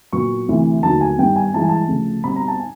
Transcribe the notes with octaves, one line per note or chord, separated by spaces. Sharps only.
A#2 F#3 B3 C#6
D2 C3 E3
D#2 D3 F#3 A3 A5
G#5
G2 D#3 G3 B3 G5
G#5
G2 E3 G#3 A5
G#5
A5
D2 C#3 F3
B2 G3 C4 B5
A#5
A5
G#5